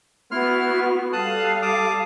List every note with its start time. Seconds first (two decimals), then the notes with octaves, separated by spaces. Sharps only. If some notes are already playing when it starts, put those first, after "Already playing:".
0.31 B3 E4 F#4 C6 F6
1.13 G3 A4 F5 A5 D#6 F#6
1.62 A5 D6 D#6